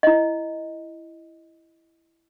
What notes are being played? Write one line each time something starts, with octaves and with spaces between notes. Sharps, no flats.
E4 D#5